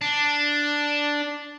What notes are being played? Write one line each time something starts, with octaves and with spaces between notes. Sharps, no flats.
D4